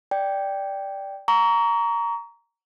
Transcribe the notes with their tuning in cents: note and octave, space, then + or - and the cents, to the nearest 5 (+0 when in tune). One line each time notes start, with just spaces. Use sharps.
D5 -5 G5 +0
A#5 +0 C#6 +35